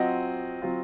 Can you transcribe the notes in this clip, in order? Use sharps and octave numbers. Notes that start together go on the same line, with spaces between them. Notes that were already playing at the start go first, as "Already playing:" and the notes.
Already playing: F#3 C4 F4 D#5 F#5
F#3 C4 F4